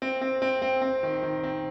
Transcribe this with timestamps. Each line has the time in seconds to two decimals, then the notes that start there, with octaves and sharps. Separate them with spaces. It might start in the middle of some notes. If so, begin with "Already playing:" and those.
0.02 C4
0.21 C4
0.42 C4
0.62 C4
0.82 C4
1.03 D#3
1.23 D#3
1.43 C4